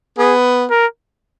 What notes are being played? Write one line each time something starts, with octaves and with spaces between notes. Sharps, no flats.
B3 G#4
A#4